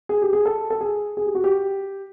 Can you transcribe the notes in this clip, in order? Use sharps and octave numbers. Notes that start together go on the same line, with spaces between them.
G#4
G4
G#4
A4
A4
G#4
G#4
G4
F#4
G4